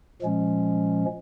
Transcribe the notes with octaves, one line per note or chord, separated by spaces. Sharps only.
A#2 F3 G#3 C#4